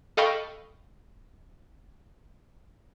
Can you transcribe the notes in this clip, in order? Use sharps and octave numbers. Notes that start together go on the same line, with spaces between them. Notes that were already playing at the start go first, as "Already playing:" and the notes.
A4 D#5 F5 G5 B5 C#6